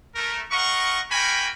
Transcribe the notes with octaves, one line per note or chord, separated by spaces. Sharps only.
A3 A#4
F4 A#4 D#5 F#5 C#6
A#3 F#4 A#4 G5 G#5 B5